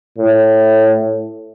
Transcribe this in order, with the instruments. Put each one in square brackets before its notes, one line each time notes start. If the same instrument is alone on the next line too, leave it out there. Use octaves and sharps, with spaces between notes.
[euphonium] A2